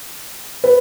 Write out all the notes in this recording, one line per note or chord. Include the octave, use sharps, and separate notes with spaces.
B4